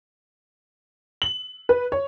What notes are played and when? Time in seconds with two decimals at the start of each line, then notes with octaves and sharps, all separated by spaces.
1.22 F#7
1.69 B4
1.92 C#5